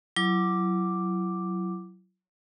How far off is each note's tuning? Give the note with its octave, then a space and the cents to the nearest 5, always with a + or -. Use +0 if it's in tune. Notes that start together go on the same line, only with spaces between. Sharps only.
F#3 +5 E4 +30 D6 +0